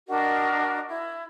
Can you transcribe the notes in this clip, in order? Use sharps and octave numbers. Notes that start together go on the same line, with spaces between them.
D4 F#4 A#4 D#5
E4